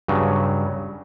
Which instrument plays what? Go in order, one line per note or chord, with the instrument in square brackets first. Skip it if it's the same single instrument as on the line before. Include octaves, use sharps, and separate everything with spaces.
[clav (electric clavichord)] G2 C#3 F#3